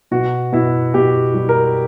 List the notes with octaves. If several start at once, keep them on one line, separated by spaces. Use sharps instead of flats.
B2 F#4
B2 E4
B2 G4
G3
A#4